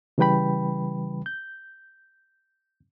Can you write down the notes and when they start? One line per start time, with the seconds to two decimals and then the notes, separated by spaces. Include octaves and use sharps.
0.18 C#3 E3 G3 B4 G5 B5
1.26 G6